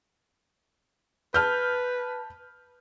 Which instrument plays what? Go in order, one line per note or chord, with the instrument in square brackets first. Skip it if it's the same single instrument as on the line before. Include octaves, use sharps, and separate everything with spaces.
[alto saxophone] B4 [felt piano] A5 F6 G6